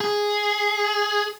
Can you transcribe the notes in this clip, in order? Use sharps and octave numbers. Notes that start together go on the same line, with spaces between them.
G#4